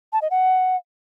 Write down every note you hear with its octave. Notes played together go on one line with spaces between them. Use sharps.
A5
D#5
F#5